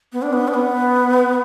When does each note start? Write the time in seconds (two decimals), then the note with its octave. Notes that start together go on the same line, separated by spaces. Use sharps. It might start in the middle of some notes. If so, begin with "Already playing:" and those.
0.13 B3
0.22 D4
0.33 B3
0.48 D4
0.54 B3